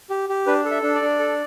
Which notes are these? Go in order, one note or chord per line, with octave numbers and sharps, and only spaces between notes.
G4
G4
D4 B4
A4
E5
D4
D5
D4
A4